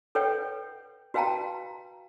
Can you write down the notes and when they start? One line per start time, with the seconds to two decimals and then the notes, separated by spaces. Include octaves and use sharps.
0.15 A4 B4 C#5 F#5 G5
1.14 F#4 B4 F5 G5 A5 A#5